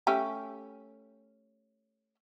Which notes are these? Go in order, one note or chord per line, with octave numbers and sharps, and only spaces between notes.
A3 C#4 G4